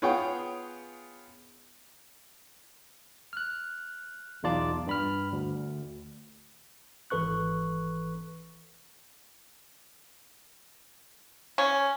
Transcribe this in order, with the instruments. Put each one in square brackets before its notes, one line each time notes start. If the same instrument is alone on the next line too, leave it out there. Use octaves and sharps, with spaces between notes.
[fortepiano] B3 F4 G#4 C#5 F#5 G5
[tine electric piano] F6 F#6
B1 E2 D#4 F4 D5 A5
G2 B5 F6
D2
G#1 E3 A4 B4 C#6 F#6
[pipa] C#4